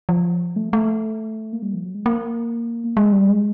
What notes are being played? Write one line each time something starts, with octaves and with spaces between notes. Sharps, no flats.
F3
A3
A3
A#3
G3
F3
F#3
G#3
A#3
G#3
G3
G#3